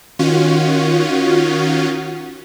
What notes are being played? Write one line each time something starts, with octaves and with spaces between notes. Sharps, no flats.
D#3 C#4 F4 F#4